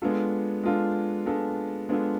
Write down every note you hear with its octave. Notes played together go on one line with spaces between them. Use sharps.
G#3 B3 D4 F4 A4
G#3 B3 D4 F4 A4
G#3 B3 D4 F4 A4
G#3 B3 D4 F4 A4